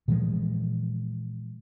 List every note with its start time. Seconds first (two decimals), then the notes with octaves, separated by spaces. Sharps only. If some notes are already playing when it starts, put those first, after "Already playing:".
0.08 A#2 E3 F3 G#3